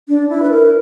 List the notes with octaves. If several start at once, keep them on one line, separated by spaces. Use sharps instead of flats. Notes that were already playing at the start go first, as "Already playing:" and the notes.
D4
E4
B4
A#4